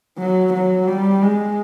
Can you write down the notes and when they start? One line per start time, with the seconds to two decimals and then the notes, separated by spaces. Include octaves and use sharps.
0.19 F#3
0.53 F#3
0.87 G3
1.22 G#3